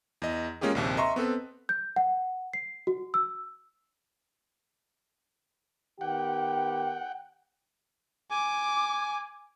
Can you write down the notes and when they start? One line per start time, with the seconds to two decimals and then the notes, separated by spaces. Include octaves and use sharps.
0.22 E2 D#5
0.61 G#3 A#3 C#4 F4 G4 G#4
0.75 A#1 D#2 C3
0.97 D#5 E5 A#5 C6 C#6
1.16 B3 C4 A4 B4
1.69 G6
1.96 F#5
2.53 C7
2.87 F#4
3.14 E6
6.01 D#3 B3 G4 F#5 G5
8.31 G#5 D6